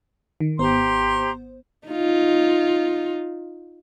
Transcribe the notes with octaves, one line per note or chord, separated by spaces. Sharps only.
D#3
G#1 B3 G4 C5 A#5 C6
D#4 F4